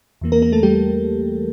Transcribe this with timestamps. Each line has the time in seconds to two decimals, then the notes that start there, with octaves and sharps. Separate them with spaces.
0.21 E2 E3 A#3
0.32 A#3 A#4
0.42 A#3 A#4
0.52 A3 A4
0.63 G3 G4